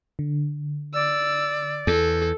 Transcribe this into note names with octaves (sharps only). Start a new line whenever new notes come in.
D3
D5 E6
E2 A4